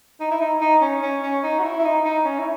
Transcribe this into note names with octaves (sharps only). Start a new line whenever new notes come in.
D#4
E4
D#4
D#4
C#4
C#4
C#4
D#4
F#4
E4
E4
D#4
D#4
C#4
E4